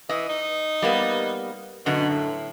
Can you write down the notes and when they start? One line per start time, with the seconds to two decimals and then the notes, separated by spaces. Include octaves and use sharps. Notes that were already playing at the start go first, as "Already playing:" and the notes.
0.09 E3 D#5
0.29 D#4
0.82 G3 A#3 B3
1.86 F#2 B2 D3
2.09 A2